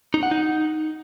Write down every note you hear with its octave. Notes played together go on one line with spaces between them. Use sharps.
D#4
F#5
D#4